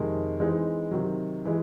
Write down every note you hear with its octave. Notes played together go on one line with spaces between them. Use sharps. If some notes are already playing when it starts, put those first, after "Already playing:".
Already playing: F2 C3 D#3 G#3
E3 G#3 C4 D#4
C3 D#3 F#3
E3 G#3